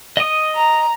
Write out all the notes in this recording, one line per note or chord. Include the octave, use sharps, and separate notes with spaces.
D#5 D#6
A#5